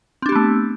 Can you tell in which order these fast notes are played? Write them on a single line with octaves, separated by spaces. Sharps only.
C4 D4 G4 B3 A3